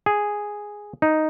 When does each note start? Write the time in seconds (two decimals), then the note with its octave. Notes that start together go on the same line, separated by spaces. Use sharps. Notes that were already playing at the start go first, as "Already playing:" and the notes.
0.06 G#4
1.02 D#4